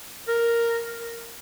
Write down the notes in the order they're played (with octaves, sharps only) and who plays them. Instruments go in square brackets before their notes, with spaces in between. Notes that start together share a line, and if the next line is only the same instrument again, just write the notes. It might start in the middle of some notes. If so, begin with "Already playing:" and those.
[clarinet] A#4